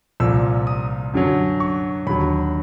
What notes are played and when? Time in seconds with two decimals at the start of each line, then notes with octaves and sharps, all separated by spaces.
0.20 C2 A#2 F3 E6
0.67 D#6
1.14 F#2 D3 F#3
1.60 C#6
2.07 D#2 D3 F#3 B5